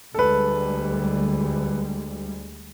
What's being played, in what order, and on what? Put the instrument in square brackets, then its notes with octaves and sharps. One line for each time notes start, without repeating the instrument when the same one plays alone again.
[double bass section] D2 G3 G#3 [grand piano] A4 B4